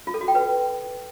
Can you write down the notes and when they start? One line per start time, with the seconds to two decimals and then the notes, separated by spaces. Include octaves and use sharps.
0.07 F4
0.14 A4
0.21 F#4
0.28 G5
0.35 B4